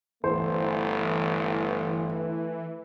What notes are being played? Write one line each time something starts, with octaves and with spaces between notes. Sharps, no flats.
G1 E3 A3 C5